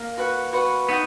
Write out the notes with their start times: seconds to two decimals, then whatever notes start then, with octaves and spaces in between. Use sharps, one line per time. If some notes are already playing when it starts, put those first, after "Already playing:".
Already playing: A#3
0.17 F#4 B4 F#5
0.53 F#4 B4 F#5
0.89 B3 D#4 F#4